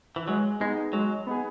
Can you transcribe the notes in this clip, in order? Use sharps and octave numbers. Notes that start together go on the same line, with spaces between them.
E3
F#3 G#3
G#3 B3 D#4 G#4
F#3 G#3
B3 D#4 G#4